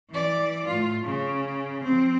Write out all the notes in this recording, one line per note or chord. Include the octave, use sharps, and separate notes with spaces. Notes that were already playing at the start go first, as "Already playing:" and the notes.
E3 D5
A2 F4
C#3
F3 C4